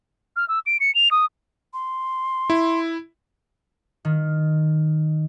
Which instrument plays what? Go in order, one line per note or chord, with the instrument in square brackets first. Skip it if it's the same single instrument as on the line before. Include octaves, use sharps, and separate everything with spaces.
[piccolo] F6
E6
D7
C#7
F7
D#6
[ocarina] C6
[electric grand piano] E4
[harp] D#3